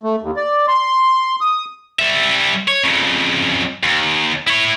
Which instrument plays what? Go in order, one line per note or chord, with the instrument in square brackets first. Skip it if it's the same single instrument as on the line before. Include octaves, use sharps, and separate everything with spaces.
[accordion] A3
D#2
D5
C6
D#6
[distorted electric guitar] G3 E5
C#5
F2 C#3
D#2
E4 C#5